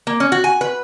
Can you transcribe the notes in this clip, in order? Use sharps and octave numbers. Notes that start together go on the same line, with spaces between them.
A#3
C#4
F#4
G#5
B4